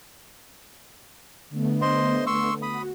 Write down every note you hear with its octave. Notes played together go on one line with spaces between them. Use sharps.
D3 A3 B3
C5 D#5 C6
C6 C#6 E6
F#4 B5 D#6